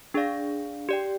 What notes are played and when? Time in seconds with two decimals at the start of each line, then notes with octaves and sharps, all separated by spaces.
0.14 D4 G#4 D5 F5
0.89 G4 D5 G5